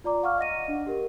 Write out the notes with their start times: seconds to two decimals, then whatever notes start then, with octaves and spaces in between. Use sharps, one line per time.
0.04 F4 D5 A#5 D6
0.23 F5 F#5 C#6 D6 F6
0.38 D#5 F#5 A#6 D#7
0.68 D4
0.87 G4 A#4